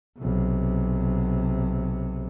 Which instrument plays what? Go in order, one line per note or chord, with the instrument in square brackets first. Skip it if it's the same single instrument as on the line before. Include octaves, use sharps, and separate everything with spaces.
[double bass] B1 C3